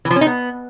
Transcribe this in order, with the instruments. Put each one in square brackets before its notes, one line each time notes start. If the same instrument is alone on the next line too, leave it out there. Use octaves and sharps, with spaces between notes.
[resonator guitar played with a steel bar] E3
F3
C#4
D#4
B3